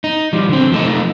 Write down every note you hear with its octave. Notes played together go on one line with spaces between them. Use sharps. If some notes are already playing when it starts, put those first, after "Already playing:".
D#4
F3 G3
D3 C4
F3 A3 D#4